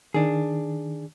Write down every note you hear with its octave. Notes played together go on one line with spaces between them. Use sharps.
D#3 D4 G#4